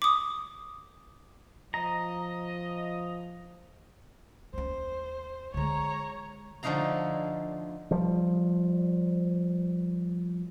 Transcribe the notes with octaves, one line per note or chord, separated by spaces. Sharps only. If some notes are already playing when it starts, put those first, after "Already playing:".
D6 D#6
F3 D#5 A#5
D#2 C#4 C5
D3 G#3 C#5 A#5
D3 F3 A3 D#4 F5 A#5
F3 G3